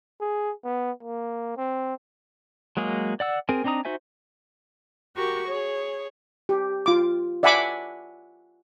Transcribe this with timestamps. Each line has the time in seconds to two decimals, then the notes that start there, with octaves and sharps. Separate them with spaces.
0.21 G#4
0.64 B3
1.03 A#3
1.58 C4
2.77 F#3 G#3 A#3 G#4
3.20 D5 F#5 E6
3.49 C4 G#4 A#4 G#5
3.64 C4 D4 D#4 A#5 D#6
3.85 D#4 F#4 C5 E5 G#5
5.17 F#4 G4 A#4 C#6
5.47 G#4 C#5
6.49 G4
6.86 F4 D6
7.43 D5 E5 F#5 G#5 B5 D6